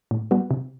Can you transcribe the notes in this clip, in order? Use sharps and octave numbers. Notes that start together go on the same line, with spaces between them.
A2
G3 B3 F#4
C3